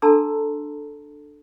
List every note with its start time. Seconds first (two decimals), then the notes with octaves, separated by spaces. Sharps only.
0.02 D4 A4 A5 A#5 C6 E6